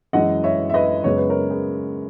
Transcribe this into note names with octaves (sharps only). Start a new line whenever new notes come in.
F#2 E3 G#3 D#5 F#5
C#5 E5
E5
B4 D#5
F#2 C#3 G#3 B3 C#5
B4
A#4 C#5
G#4 B4